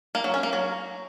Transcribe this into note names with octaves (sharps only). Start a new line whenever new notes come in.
A#3
F#3
C#4
A#3
F#3